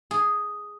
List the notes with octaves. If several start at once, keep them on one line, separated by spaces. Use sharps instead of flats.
G#4